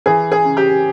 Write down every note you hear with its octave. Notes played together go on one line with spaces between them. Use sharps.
E3 G#4
G#4
C#3
G4